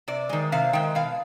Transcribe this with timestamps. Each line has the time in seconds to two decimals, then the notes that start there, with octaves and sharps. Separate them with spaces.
0.08 C3 D5
0.29 D#3 G#3
0.52 C3 F5
0.73 D#3 G#3 G5
0.95 B2 F5